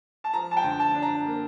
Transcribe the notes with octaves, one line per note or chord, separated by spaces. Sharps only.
A5
F3 A#5
A5
G5
D3
A5
D4
A#5
A#3